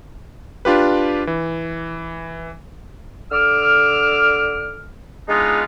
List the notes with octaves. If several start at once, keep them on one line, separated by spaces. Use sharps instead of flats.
D4 F4 G4 B4
E3
D3 D6 E6 F6
G#3 B3 D4 D#4 F4